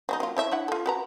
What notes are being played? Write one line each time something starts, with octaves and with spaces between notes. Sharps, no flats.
F#3 C#4 D#4
F#3 A#3 F4
E4 C#5 E5
D4 E4 F#5
F4 A4
F#4 B4 A#5